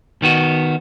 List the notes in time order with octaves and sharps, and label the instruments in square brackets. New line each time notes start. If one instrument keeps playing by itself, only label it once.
[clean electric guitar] D#3 B3 F#4